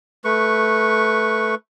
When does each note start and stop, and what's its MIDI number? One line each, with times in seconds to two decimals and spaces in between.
0.25 1.55 57
0.25 1.55 71
0.25 1.55 85